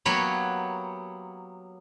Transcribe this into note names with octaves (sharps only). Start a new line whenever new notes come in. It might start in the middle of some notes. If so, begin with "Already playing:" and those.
F#3 A#3 B3 F#4 G4 C#5